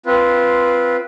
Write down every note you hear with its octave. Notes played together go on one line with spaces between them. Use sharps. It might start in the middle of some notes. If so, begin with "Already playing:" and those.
C4 F4 B4